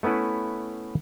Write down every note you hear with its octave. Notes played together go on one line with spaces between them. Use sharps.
A3 B3 C#4 E4 B4